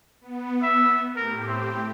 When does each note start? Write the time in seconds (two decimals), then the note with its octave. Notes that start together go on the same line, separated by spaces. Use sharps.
0.21 B3
0.62 E5
1.16 A2 G4 A#4
1.48 C4